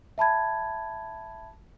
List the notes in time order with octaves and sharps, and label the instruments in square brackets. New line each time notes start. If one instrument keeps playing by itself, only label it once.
[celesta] E5 A5 B5 G#6